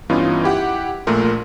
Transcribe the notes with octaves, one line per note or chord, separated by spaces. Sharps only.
G2 E3 B3 C#4 D#4 F4
E4 G4 F#5
A#1 A#2 A3 A#4 C6